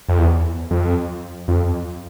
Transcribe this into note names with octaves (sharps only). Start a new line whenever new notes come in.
F2
E2
F2
F2